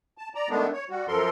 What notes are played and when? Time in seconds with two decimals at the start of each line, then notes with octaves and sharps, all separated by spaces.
0.18 A5
0.35 D5 A#5
0.49 D#3 G#3 A3 B3 D4
0.73 C#5
0.90 G3 F#4
1.08 F#2 F3 A4 A#4 C6